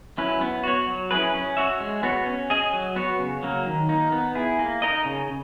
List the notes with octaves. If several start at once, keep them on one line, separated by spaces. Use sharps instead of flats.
F#3 C#4 E4 B4
B3
F#4 C#5
F#3
C#4 E4 G#4 B4
C#4
F#4 C#5 E5
G#3
B3 F#4 C#5
C#4
G#4 D#5
F#3
B3 F#4 C#5
C#3
F#3 A#3
D#3
A#3 D#4
B3
E4 G#4
A#3
D#4 A#4 D#5
C#3